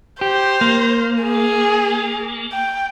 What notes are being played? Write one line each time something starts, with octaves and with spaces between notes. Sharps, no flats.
G4 C5
A#3
G#4
G5